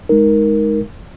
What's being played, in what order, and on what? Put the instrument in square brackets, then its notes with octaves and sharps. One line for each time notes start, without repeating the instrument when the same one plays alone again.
[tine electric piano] G#3 D#4 A#4